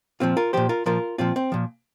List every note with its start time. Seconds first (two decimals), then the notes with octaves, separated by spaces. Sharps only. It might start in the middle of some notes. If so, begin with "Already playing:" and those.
0.20 A#2 F3 C4 F4
0.37 F4 A#4
0.53 A#2 F3 G4 C5
0.69 F4 A#4
0.86 A#2 F3 F4 A#4
1.18 A#2 F3 C4 F4
1.36 C4
1.52 A#2 F3